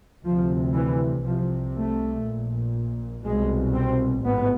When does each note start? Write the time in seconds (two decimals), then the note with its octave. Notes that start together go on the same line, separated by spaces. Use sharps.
0.24 D2 C3 F3
0.74 E3
1.24 C2 C3 F3
1.75 A3
2.24 A#1 A#2
3.25 C2 B2 G#3
3.74 C4
4.25 A1 G#2 B3